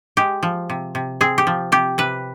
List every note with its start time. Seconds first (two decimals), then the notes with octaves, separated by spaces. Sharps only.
0.17 G#3 G4
0.43 F3
0.70 C3
0.95 C3
1.21 C4 G#4
1.38 G4
1.47 F3
1.72 C3 G4
1.98 C3 B4